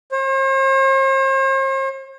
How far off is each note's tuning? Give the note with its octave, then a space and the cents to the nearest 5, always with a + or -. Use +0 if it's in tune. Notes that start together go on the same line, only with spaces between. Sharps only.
C5 +45